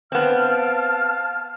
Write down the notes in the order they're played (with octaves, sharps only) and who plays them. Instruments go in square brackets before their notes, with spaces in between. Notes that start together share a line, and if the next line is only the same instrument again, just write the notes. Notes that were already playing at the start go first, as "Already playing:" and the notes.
[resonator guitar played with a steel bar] B3 C4 [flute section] F5 A5 F6